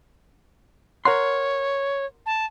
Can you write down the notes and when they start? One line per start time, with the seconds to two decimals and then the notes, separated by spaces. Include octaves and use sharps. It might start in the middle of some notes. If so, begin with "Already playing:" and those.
1.05 A#4 C#5 F#5 C6
2.26 A5